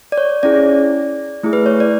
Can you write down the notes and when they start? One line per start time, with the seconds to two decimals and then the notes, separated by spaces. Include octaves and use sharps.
0.12 D5
0.18 C#5
0.43 C#4 E4 G#4 D5
1.43 A3 E4 G#4
1.53 B4
1.66 C#5
1.80 D5